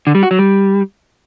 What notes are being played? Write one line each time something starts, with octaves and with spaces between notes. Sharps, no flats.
D3
G3
F#4
F#3
G3